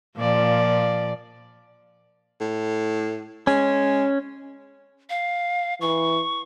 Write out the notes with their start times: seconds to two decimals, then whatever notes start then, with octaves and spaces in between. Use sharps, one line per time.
0.16 A#2 F3 D5
2.41 A2
3.47 G#3 C#4
5.10 F5
5.81 E3 C#6